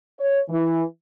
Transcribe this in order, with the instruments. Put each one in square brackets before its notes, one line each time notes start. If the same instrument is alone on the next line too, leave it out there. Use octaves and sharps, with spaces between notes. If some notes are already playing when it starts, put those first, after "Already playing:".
[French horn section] C#5
E3